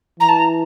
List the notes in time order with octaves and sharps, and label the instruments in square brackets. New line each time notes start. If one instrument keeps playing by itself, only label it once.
[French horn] E3 [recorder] A#5
[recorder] A5
A#5